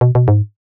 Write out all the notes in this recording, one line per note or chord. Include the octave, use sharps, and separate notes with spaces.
B2
B2
G#2